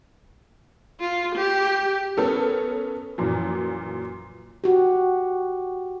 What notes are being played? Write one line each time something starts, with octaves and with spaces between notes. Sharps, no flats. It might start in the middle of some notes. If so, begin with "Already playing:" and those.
F4
G4
B3 C#4 A4 A#4
F#2 A#2 E3 F3
F#4 G4